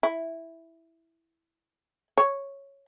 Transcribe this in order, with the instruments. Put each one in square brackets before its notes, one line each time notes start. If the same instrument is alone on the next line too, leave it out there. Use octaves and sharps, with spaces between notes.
[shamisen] E4
C#5